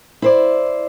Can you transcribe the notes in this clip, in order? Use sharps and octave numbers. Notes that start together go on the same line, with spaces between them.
E4 C5 D5